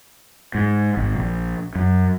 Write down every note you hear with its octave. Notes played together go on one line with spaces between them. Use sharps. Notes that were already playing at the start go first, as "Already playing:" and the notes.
G#2
G#1
A#1
F#2